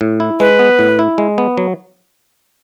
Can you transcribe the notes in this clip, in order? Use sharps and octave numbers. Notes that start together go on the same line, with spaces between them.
A2
E4
G#3 B4
B3
A2
E4
G#3
B3
F#3